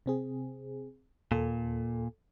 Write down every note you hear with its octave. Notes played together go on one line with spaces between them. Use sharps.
C3 C4 G#4
D#2 A#2 A4